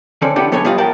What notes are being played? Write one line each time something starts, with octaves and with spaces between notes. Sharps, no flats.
D3 C4 C#4 A4 D5
B3 D4 E4 F#4 G4 A4
F#3 B3 A4 C#5 G#5
G3 B3 F4 D5 D#5 F5
A#4 F#5 G5 A5